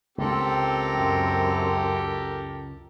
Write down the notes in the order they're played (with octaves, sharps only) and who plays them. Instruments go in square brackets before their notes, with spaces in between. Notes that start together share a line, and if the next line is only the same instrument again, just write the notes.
[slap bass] C#2 [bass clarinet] C4 [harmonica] G4 A4 A#4
[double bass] F#2